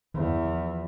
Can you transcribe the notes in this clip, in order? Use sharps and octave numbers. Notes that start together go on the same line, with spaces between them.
E2 E3
F3